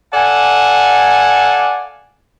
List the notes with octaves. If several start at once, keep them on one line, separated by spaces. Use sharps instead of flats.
A4 D5 F5 F#5 G#5